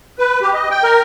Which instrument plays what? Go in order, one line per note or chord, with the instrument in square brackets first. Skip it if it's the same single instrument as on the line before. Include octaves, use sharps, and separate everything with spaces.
[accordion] B4
G4
D#5
G5
A#4